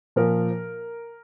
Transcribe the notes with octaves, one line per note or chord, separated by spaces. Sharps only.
A#2 F3 A#4